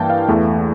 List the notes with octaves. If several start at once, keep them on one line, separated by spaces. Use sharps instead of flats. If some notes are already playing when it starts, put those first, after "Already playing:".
Already playing: G2 E3 A#3 G5 A5
F5
E2 E3 A3